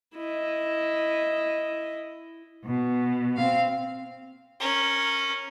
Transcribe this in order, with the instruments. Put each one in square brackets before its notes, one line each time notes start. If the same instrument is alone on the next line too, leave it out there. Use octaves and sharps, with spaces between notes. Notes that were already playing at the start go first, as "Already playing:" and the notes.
[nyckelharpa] E4 D#5
[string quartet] B2
C4 F5
[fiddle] C#4 A#4